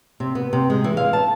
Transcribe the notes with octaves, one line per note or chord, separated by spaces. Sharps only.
C3
B3
C3
G#3
E3
F5
A5